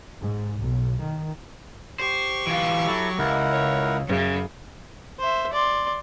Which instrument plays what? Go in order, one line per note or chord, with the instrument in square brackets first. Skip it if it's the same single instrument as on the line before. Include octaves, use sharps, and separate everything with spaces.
[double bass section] G#2
B1
D#3
[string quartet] G4 C#6 [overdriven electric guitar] C5
[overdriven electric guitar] E3 F4
[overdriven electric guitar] F#3 [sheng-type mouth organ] E4 A4
[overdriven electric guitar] C#2 [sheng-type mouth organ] E4 A#4 F#5
[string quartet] C#5
F#2 C#3
[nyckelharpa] C5 E5
D5 C6